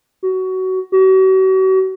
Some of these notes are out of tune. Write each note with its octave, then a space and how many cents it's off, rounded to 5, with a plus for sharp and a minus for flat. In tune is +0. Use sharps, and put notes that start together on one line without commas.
F#4 +20
F#4 +40